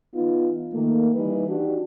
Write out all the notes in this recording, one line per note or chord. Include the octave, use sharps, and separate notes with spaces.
E3 B3 D#4 F4
D#3 A3 A#3
E3 G3 D#4 B4
D4 D#4 F#4 G4